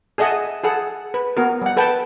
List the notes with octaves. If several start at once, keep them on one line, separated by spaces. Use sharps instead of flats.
G#4 A4 D#5 E5 F#5 G#5
G#4 A4 F#5
B4
B3 F#4 A#4
G3 F#5
A4 B4 F#5 G5 A5